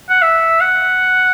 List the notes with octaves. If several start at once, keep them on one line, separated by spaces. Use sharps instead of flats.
F#5
E5
F#5